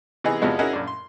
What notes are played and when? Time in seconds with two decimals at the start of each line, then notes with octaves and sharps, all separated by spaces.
0.24 C3 E3 B3 D#4 G#4
0.41 E2 C3 F3 G#3 B3 D#4
0.59 C#4 D#4 E4 F#4 G#4 A#4
0.73 A#1 F#2 D4
0.87 C6